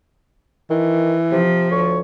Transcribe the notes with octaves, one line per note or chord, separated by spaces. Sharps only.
D#3 E3
C3 F3
D2 C#5